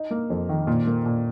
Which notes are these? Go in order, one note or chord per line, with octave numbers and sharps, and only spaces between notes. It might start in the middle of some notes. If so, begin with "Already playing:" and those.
Already playing: D#4
A#3
F2
D#3
A#2
A#3
A#2